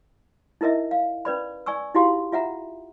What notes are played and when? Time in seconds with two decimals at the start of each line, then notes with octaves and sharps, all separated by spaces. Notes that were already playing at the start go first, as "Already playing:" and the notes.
0.61 D#4 E4 A#4 D#5 E5
0.91 F5
1.25 C#4 B4 D5 B5
1.66 D5 G#5 C#6 E6
1.95 D#4 E4 F#4 G4 F5 C6
2.32 F4 E5 F#5 A#5